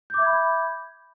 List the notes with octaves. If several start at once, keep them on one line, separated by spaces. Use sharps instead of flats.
E5 B5 D6 G6 G#6